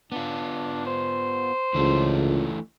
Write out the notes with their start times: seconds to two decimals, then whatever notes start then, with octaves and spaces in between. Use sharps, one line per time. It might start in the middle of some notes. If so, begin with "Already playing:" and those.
0.12 B3 D4 F4
0.86 C5
1.74 C#2 E3 A3 D4